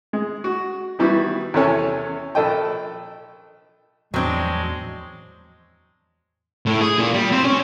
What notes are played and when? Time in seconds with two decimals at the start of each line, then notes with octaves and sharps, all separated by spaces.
0.13 G#3
0.44 F#4
0.99 D#3 E3 G3 B3 E4 F#4
1.54 E2 C3 C#4 A4 C#5 G#5
2.35 A#1 A4 D#5 G5
4.14 E2 A2 F3 F#3 G#3 C4 D4
6.66 A2
6.81 G#4
6.98 A#2
7.14 G3
7.32 C4
7.44 C#4